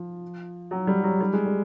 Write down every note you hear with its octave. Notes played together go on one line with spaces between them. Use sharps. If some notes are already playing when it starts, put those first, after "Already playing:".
Already playing: F3
F#3
G3
F#3
G3
G#3
G3